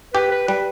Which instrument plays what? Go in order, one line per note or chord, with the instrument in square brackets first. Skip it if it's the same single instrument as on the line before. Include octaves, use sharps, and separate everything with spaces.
[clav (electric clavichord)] G4 [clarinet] B4
[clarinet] B4
[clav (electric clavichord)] G3 [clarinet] B4